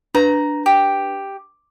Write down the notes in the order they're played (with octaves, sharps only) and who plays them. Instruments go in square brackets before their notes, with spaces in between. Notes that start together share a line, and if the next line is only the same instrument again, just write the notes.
[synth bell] D4 B4 [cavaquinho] A#5
[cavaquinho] G4